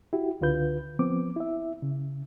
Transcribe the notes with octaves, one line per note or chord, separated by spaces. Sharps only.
E4 F#4 G4
C#2 D3 F4 B4 G6
F3 B3 C4 D6
E4 E5
C#3